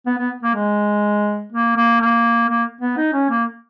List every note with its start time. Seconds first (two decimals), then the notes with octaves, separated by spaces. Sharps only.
0.06 B3
0.18 B3
0.43 A#3
0.54 G#3
1.52 A#3
1.76 A#3
2.00 A#3
2.49 A#3
2.81 B3
2.97 D#4
3.13 C#4
3.30 A#3